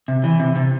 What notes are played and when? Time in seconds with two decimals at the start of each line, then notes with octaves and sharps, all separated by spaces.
0.08 C3
0.24 E3
0.40 C3
0.56 C3